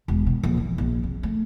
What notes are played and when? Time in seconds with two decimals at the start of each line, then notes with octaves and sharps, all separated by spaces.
0.08 E1
0.27 B2
0.43 A#1
0.57 E3
0.78 A#1
1.03 C4
1.23 A3